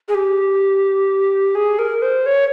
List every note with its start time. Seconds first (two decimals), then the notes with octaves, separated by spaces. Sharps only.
0.08 G#4
0.15 G4
1.55 G#4
1.79 A#4
2.02 C5
2.26 C#5